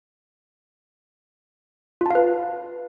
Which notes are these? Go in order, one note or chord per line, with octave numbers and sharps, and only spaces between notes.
F4 B4 F5 A5